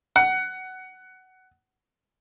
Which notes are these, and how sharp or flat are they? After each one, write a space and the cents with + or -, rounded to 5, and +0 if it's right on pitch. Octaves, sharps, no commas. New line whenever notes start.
F#5 +15